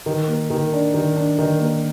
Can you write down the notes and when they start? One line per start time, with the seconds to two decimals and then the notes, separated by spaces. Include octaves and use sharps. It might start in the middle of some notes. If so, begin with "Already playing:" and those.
0.06 D#3
0.28 A#3
0.50 D#3
0.73 D4
0.94 D#3
1.16 D4
1.39 D#3
1.60 A#3